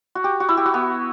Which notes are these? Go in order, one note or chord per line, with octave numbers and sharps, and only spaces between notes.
F#4
G4
F#4
E4
G4
F#4
B3